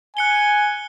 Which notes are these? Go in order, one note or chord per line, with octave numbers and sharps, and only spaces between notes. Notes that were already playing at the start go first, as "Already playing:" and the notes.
G#5 F#6 C#7 G7